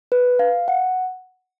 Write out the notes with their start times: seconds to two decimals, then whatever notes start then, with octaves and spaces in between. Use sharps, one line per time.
0.12 B4
0.39 F5
0.68 F#5